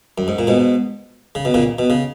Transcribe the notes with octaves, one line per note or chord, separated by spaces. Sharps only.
F#2
G#2
A#2
G#2 B2
C#3
B2
A#2 C#3
B2
C#3